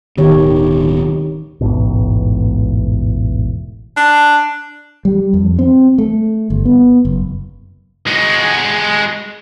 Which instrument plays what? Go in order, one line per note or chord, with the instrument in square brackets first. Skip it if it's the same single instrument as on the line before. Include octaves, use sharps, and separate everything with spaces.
[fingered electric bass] D1 B2 [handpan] D#3 G4 C#5
[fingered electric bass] E1 A1 G#2 B2
[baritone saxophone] D4
[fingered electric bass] G3
F2
C4
A3
G1
B3
F#1
[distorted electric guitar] G#3 F#4